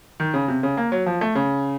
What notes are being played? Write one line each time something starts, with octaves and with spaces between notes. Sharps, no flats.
D#3
C#3
C3
C#3
A#3
F#3
F3
A3
C#3